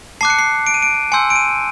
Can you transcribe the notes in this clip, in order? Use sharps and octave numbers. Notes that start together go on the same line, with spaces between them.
A5 D6 F#6 C7
C#7
C7
D7
D#7
D7
G#5 C6 E6 G6 C#7
D7
D#7